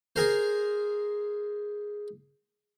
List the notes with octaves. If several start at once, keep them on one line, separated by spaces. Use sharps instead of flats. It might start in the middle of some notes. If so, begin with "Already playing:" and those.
G#4 A#4 C5